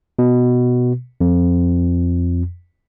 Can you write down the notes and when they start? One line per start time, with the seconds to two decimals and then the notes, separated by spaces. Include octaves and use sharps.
0.19 B2
1.21 F2